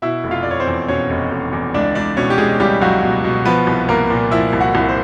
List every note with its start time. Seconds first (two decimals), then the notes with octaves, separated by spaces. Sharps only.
0.02 B2 E4 E5
0.24 F1
0.31 F4 F5
0.43 F1 D5
0.51 C#5
0.60 C4 C5
0.67 E2
0.88 B2 C#4 C#5
1.10 F1
1.31 F1
1.53 E2
1.74 C#2 D4 D5
1.95 C#2 D4 D5
2.17 B2 C#4 C#5
2.30 G4
2.38 B2 G#3 G#4
2.60 C#2 G3 G4
2.81 C#2 F#3 F#4
3.03 B2
3.24 B2
3.45 F3 B3 B4
3.67 C2
3.89 C2 A#3 A#4
4.10 A#2
4.31 F3 E4 E5
4.53 C2
4.60 F#4 F#5
4.75 C2
4.89 C5